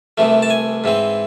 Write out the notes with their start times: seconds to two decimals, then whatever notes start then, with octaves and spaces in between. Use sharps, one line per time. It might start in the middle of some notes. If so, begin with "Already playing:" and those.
0.18 C2 C3 E3 A3
0.42 A5
0.50 G#5
0.84 G#2 E3 C4